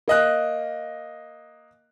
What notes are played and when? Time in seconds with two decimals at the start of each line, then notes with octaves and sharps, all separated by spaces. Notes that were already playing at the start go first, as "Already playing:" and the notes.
0.08 A#3 D#5 F#6